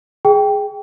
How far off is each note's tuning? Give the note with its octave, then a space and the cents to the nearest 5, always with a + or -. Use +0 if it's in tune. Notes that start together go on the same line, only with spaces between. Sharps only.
G#4 +0 G5 +0